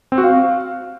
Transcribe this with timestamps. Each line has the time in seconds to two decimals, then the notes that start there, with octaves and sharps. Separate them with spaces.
0.12 C4
0.18 F#4
0.24 F5